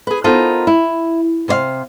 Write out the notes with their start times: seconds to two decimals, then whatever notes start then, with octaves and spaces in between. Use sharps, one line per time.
0.07 G#4 B4
0.24 B3 D#4 F4 A4 A#4 C5
0.67 E4
1.48 C3 C5 C#5 F5